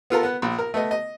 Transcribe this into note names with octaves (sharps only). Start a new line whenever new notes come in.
B3 F4 A4 A#4
B3 B4
A#1
A#4
A3 B3 D#5
D#5